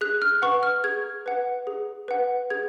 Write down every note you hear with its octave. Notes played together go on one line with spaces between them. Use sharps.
G#4 F#6
F6
B4 F#5 C#6
F6
G#4 G#6
B4 F#5
G#4
B4 F#5
G#4 G#6